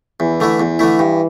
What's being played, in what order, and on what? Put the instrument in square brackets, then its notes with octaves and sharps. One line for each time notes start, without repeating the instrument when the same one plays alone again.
[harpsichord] E2 [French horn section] E3
[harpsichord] D3 A3 E4
[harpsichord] E2 [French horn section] E3
[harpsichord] D3 A3 E4
G2